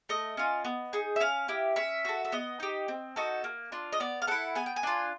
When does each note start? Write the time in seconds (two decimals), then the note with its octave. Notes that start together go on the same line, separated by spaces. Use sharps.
0.09 A3 D#5
0.37 C#4 F4
0.65 B3
0.93 D#4 G#4
1.16 E5
1.20 C#4 F5
1.48 E4 G4
1.76 C#4 E5
2.05 F#4 A4
2.25 E5
2.32 B3 D#5
2.60 D#4 G4
2.88 C4
3.16 D#4 F#4 A4
3.44 A#3
3.72 D4 F4
3.92 D#5
4.00 B3 D5
4.22 F5
4.27 E4 A4 F#5
4.55 B3 G#5
4.66 G5
4.76 G#5
4.83 D4 F4